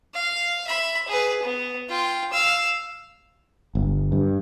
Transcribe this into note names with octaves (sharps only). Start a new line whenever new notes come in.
F5
E5 B5
G#4 B4
B3
F4 G5
F5 E6
G1
G2